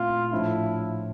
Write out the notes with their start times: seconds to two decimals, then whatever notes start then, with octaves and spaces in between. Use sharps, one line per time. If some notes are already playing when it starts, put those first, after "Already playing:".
Already playing: A#2 A3 C4 E4 F4
0.31 A2 F3 A3 D4 E4 F4